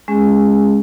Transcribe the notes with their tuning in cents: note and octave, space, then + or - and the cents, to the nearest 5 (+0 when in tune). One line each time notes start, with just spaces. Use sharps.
G#3 +0 C#4 +0 G#4 -20